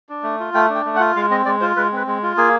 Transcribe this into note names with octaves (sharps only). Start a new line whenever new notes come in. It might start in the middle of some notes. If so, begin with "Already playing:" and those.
D4
A3
F4
A3 G5
D4
G5
A3
F#5
F4
G#3 F5
C4 D#5
G#3 D5
F4 C5
G#3 B4
C4 B4
G#3
F4
A#3 G#4